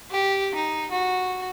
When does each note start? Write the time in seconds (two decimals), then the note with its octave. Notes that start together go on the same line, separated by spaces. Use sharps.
0.11 G4
0.55 D#4
0.91 F#4